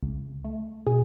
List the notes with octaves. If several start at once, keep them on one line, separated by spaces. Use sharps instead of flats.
C#2
A3
B2 G#4